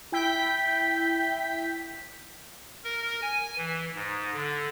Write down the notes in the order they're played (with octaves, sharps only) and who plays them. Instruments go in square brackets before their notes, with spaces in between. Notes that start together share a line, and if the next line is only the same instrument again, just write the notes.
[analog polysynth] E4 G5 G6 B6
[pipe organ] A#4
G#5
E3
G#2
D3